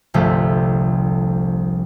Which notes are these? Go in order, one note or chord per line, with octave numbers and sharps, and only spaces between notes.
G1 C2 F3 A3 E5